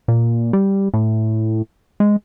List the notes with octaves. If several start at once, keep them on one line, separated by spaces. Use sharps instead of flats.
A#2
G3
A2
G#3